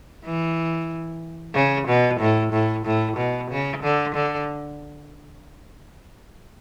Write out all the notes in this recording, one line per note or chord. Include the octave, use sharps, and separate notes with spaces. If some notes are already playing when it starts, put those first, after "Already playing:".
E3
C#3
B2
A2
A2
A2
B2
C#3
D3
D3